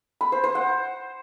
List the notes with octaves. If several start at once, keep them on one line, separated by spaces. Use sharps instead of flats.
B5
C5
C5
F#5